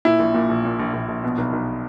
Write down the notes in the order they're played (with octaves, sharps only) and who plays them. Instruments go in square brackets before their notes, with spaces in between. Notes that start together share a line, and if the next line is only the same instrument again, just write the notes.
[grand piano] A#2 E4
A#1
A#2
A#1
A#2
A#1
A#1
A#1
B2
B1
B1